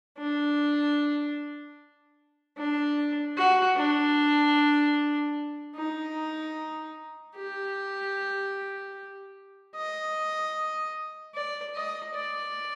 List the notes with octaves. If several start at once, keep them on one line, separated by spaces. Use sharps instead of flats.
D4
D4
F#4
D4
D#4
G4
D#5
D5
D#5
D5